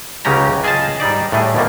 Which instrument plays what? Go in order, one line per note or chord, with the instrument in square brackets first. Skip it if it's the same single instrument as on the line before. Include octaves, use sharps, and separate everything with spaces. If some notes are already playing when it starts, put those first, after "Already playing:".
[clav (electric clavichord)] C#2 C#3 F#3 C#4 G4 A#5
F4 G#4 D#5 G5 A5
G#2 G3 D#4 D5
A2 G3 A3 G#4
B2 F3 A3 A#3